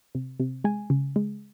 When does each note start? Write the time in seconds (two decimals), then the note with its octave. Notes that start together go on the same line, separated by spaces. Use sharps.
0.15 C3
0.40 C3
0.64 G#3 G#5
0.90 C#3
1.16 G#3